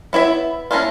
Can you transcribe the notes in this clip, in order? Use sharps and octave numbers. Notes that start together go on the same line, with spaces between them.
B3 E4 C#5 E5
A#3 C#4 D4 E4 F4